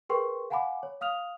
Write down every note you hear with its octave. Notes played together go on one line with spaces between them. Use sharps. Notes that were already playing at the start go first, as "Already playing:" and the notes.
G#4 A#4 B4 G5 C6 C#6
F5 F#5 G#5 A#5 B5 D6
C#5
F5 D#6 F6 F7